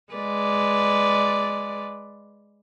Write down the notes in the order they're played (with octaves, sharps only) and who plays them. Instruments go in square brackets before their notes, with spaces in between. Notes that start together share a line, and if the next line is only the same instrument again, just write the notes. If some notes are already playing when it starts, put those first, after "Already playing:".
[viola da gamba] G#3 B4 D5